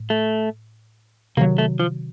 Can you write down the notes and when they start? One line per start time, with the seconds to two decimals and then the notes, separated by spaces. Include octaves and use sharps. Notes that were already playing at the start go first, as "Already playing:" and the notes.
Already playing: A2
0.10 A3
1.37 C3 D#3 F#3 A#3
1.58 A3
1.80 F3